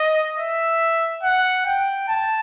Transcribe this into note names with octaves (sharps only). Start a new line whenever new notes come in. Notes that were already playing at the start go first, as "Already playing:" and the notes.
Already playing: D#5
E5
F#5
G5
A5